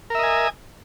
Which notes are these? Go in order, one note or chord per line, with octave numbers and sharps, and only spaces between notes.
A#4 D#5 E5 G#5